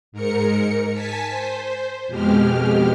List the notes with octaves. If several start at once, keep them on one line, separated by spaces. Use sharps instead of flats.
G#2 A#4 C#7
G#5 A5 B6
C5
F2 B2 G#3 G4 F6